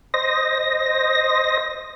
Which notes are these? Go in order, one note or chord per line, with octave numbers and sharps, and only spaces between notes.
C5 D#5 A#6